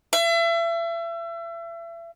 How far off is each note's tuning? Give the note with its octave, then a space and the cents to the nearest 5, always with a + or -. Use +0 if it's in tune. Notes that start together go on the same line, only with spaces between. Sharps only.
E5 +35